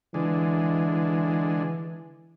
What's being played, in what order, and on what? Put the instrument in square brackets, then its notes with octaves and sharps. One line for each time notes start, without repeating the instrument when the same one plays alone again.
[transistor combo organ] D3 G#3 [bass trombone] E3